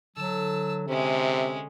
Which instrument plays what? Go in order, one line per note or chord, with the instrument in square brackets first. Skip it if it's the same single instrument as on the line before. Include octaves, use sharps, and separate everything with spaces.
[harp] D3 [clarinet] F#3 [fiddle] A5 E6
[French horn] C3 [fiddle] G#3 C#4 [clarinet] E5